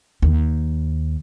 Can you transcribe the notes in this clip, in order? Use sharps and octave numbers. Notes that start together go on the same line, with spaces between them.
D#2